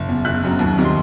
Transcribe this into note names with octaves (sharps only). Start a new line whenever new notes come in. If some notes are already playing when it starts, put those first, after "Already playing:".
Already playing: F#1
E2 B2
F#1 F#6
F#2 F#3 C4
D#2
D#3 G3 C4
C6